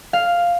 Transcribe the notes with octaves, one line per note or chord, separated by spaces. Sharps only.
F5